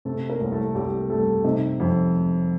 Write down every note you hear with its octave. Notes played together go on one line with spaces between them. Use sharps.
C3 A3 A4
A#3 A#4
C2
A3 A4
C2 G3 G4
G3 A3 A4
C3 D#4 D#5
F2